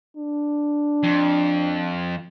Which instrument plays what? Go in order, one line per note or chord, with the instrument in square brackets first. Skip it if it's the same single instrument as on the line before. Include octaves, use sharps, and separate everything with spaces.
[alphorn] D4
[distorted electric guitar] F2